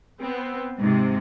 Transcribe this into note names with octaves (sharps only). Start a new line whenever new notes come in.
B3 C4
G#2 C3